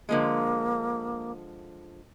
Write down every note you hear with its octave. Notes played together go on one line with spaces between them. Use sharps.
D3 F3 G#3 A#3